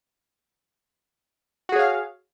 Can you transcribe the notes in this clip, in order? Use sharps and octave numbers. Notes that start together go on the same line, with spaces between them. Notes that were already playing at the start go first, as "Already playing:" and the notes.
F#4 G#4 C#5 F5